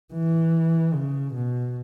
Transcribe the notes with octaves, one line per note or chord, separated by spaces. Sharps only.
E3
C#3
B2